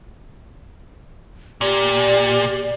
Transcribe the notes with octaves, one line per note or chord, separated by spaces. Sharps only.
A#2 G4 D5